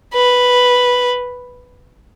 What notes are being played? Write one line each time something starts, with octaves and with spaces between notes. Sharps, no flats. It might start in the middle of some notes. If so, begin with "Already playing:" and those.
B4